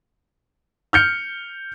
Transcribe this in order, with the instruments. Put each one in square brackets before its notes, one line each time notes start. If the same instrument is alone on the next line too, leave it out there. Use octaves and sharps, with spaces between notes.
[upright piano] F6 G6 C#7